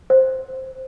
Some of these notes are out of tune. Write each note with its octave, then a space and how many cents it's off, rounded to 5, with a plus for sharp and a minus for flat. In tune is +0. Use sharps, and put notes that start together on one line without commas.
C5 +5